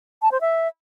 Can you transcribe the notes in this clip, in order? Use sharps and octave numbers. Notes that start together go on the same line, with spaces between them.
A5
C5
E5